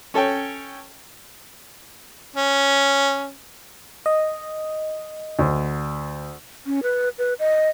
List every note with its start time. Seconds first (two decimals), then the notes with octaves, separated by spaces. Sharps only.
0.14 C#4 A4 C#5 G5
2.36 C#4
4.06 D#5
5.39 D2
6.66 C#4
6.83 B4
7.18 B4
7.39 D#5